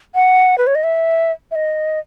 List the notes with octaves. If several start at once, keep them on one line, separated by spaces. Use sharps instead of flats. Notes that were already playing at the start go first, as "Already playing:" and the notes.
F#5
B4
C#5
D#5
E5
E5
D#5